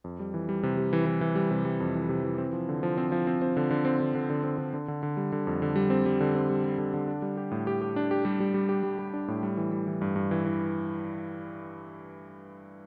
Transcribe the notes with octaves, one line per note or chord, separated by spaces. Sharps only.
F2
G3
E3
G3
C3
G3
E3
E3
E3
G3
C3
G3
F2
E3
C3
E3
C4
F3
D3
F3
C4
F3
C4
C4
D3
D3
C4
D3
D3
D3
C4
D3
D3
D3
D3
G3
D3
F2
D3
G3
C4
G3
D3
C4
G3
G3
D3
D3
D4
G3
G4
A2
G4
G4
D4
G4
G3
G3
G3
G4
G3
G3
D4
A2
G3
E3
G3
E3
G2
G2
E3
E3